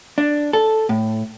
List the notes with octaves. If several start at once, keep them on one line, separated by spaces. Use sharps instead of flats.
D4
A4
A2